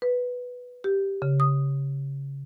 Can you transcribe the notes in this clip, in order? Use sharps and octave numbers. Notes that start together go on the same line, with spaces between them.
B4
G4
C#3
D#6